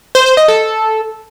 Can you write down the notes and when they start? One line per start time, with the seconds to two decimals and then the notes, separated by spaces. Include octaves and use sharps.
0.15 C5
0.26 C5
0.37 D#5
0.48 A4